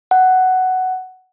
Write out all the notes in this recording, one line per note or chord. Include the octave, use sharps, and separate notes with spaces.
F#5